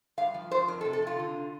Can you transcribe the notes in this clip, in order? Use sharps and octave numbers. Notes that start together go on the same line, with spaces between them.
G2 F5
F3
F3 C5
F2 A#4
A4
C3
A4
C3 F4
D3